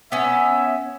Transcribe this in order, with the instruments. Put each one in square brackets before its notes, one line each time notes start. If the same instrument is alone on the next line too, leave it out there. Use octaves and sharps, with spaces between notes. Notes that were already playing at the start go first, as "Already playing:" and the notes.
[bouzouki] B3 C#4 [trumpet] E5